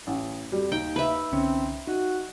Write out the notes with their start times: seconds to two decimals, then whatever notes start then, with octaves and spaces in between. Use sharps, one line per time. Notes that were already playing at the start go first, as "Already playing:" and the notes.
0.07 A1
0.52 F2 G3
0.72 D#2 D#4 G5
0.96 B4 E5
1.32 C2 D3 C4 C#4
1.87 D#4 F#4